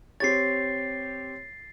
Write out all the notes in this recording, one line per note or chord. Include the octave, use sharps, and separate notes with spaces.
C4 G4 C#5 A6 C7